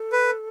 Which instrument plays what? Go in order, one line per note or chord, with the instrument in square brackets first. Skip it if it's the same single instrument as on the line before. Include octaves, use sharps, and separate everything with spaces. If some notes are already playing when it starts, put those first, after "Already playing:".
Already playing: [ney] A4
[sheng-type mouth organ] B4